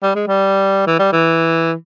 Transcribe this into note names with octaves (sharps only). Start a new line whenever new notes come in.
G3
G#3
G3
E3
G3
E3